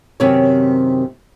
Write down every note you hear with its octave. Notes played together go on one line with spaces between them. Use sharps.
F#2 C3 D#3 C4 G4 C#5